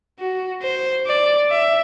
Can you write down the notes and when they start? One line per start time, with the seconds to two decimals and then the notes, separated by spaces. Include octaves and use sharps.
0.19 F#4
0.62 C5
1.07 D5
1.51 E5